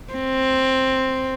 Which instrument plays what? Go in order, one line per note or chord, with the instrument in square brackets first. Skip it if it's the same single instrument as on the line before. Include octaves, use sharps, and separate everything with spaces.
[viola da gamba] C4